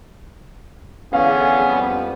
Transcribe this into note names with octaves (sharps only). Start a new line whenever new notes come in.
D3 E3 B3 C#4 G#4 F5
F2 F3 G3